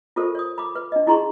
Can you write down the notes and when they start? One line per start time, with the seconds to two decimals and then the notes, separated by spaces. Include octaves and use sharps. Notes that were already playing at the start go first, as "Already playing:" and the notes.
0.16 F4 G4 A4 A#4 C5
0.35 C#5 D#6
0.58 B5 D6
0.75 B4
0.92 D4 D#5
1.07 D#4 E4 G#4 A#5 C6 C#6